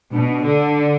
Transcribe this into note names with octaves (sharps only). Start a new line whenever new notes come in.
B2 D4
D4
D3